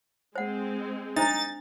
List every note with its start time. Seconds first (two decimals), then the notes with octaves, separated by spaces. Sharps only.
0.36 G#3 C4 C5 F#5
1.16 D4 D#4 C5 A#5 A6